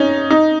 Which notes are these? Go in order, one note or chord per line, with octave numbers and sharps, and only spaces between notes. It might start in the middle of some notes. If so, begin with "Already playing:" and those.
Already playing: C#4 D#4
D#4